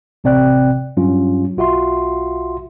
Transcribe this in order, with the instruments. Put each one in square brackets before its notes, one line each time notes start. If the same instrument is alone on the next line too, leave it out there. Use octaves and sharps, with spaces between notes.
[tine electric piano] A1 C3 C4 D5 G5 F#6
G2 F#3 C#4 F4
B1 F4 F#4 E5 C6